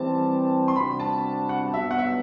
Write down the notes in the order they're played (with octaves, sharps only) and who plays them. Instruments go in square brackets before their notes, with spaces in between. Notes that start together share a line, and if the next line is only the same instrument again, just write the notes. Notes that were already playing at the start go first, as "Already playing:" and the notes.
Already playing: [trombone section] E3 G3 C4 G4 [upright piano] A5
[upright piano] C6
[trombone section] C3 G3 D4 F#4 [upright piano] B5
[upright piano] A5
F#5
[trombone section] G2 F#3 B3 [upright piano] E5
[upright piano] F#5
E5